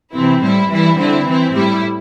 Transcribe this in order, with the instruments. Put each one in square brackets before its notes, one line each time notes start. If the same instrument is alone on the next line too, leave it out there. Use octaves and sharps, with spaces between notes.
[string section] C3 E3 C4 E4
A2 G3 E4
E3 G3 E4
D3 C4 E4
E3 C4 E4
A2 G3 E4